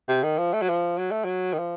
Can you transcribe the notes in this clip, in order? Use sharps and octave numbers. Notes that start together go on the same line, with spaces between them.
C3
D#3
F3
A3
F#3
F3
F#3
A3
F#3
D#3
F3